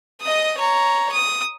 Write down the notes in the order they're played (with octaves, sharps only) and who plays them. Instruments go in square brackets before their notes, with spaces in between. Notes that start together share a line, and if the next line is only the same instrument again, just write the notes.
[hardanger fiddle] D#5 D#6
C#5 A#5
D#6